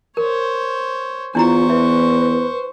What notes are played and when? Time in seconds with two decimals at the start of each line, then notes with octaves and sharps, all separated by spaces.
0.17 A#4 C5 C#5
1.35 E2 D4 E4 F4 C5 A#5 C#6
1.70 B4 E5